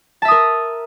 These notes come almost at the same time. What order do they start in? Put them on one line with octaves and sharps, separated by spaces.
A5 E5 D#6 A#4